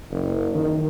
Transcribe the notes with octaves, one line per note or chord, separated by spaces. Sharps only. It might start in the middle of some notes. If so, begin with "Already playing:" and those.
F#1
D#3